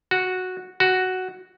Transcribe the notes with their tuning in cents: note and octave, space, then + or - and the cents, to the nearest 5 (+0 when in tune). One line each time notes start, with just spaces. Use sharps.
F#4 -5
F#4 +5